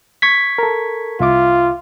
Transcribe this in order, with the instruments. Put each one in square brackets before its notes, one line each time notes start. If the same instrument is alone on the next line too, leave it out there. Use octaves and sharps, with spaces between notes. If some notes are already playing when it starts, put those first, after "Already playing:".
[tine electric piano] C#6 G#6 B6
[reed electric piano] A4 A#4
[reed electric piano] C2 E5 D6 [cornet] F4